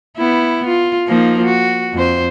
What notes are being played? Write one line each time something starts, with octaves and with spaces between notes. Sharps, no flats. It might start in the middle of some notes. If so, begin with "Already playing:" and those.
B3 E4
F4
F3 A#3 D#4
F#4
F2 C5